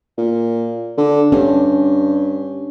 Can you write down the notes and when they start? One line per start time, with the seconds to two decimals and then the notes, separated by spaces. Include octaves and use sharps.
0.18 A#2
0.98 D3
1.32 G2 C#4 D4